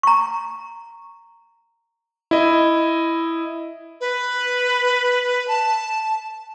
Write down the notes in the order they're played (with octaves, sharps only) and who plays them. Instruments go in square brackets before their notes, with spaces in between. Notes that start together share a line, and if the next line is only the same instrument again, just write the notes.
[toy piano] A#5 C#6
[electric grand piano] E4 D#5
[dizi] B4
A5